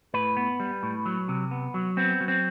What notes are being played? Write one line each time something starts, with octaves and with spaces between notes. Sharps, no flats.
A2 B4
B3
G3
A2
F#3
C3
B3
F#3
B3 C4
F#3
C4